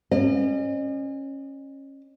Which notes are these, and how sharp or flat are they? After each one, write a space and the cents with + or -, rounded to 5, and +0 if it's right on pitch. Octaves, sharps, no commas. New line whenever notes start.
C#4 -25 D#5 -45